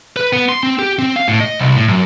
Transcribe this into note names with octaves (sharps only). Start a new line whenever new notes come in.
B4
B3
C6
C4
G4
C4
F5
A2
D#5
C2
A2
F#2